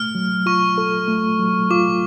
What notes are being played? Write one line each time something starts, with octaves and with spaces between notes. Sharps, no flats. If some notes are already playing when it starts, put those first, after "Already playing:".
Already playing: A3 F6
F#3
F4 C#6
A4
A3
F#3
F4 D6